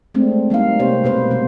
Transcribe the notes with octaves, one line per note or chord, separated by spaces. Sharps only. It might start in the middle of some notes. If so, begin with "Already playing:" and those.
G#3 A3 C4 D4
G3 A#3 D#4 F5
C3 A#3 C4 G4 C5 C#5
B2 A#3 B4 C5
C3 G3 B3